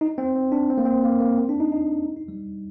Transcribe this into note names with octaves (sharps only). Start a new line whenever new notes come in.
D#4
C4
C4
D4
C4
A#3
C4
A#3
A#3
C4
D4
D#4
D#4
D#4
G3